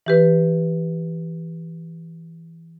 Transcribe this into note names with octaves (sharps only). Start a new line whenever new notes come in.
E3 G4 B4